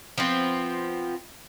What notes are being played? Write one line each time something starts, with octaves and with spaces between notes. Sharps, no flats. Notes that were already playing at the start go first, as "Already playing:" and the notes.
F3 B3 C4